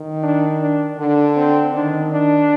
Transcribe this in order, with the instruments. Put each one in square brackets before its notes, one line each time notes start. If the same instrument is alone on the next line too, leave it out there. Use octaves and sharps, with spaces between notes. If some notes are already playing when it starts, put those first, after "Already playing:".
Already playing: [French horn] D#3
[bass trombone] D4
D4
[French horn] D3 [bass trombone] D4
[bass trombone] C4
[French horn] D#3 [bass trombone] D4
[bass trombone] D4